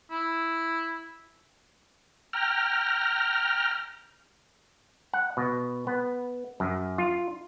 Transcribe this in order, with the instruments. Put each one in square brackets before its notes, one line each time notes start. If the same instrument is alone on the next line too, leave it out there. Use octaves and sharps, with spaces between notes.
[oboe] E4
[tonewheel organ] G5 A#5 F6
[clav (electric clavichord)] F#5
B2
B3
F#2
F4